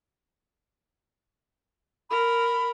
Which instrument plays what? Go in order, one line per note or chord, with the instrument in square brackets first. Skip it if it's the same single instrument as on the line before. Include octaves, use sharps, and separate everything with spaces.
[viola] A#4 [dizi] B5